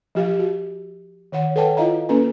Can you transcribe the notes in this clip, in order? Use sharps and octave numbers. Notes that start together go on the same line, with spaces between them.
F3 G4 F5
F#4
D#3 C#5 F#5
A4 B4 C#5 F#5 G5 A5
E4 F4 D#5 F5 A#5
A#3 C#4 A4 B4 A#5